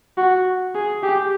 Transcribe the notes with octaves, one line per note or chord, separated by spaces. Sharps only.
F#4
G#4
G4